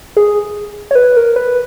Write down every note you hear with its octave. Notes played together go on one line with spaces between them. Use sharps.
G#4
C#5
B4
A#4
B4